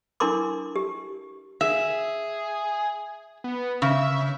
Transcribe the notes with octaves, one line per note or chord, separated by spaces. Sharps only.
D4 E4 A#4 C6 D6
G4
G#4 E5
B3
C#3 E5